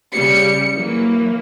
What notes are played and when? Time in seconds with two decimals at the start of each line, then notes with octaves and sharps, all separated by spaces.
0.13 C#3 G3 C#7
0.72 E3 F#3 A#3